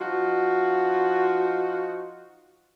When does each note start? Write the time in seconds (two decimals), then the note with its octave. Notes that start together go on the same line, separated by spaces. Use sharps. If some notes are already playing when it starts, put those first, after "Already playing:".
0.01 F3 D#4 F4 F#4